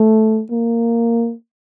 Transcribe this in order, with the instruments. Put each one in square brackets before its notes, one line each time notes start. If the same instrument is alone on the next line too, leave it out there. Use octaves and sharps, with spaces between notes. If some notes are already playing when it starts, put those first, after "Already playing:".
Already playing: [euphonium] A3
A#3